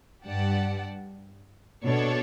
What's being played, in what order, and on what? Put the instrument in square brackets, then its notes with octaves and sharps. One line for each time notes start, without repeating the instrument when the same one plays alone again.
[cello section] G2 [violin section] G4 D5 F#5 A5
[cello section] B2 [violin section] D4 A4 C#5